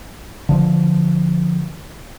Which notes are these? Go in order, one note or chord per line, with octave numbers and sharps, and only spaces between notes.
D3 F3